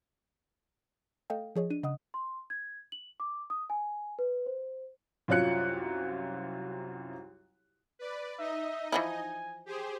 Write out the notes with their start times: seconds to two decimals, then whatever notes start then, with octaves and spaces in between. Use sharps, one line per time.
1.30 A3 A4 D#5 F5 G5
1.56 F3 G#4 C#5 D#5
1.70 D4 D#7
1.83 C#3 D#5 F#5 D#6
2.14 C6
2.50 G#6
2.92 F#7
3.20 D6
3.50 D#6
3.70 G#5
4.19 B4
4.46 C5
5.28 C2 F#2 F4 C#5 F#6 C#7
7.99 B4 D5
8.39 D#4 D#5 E5
8.92 E3 F3 E4 G#5
9.66 G4 G#4 C5